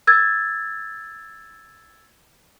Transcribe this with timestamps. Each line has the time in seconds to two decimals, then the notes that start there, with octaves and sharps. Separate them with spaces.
0.07 E6 G#6 A6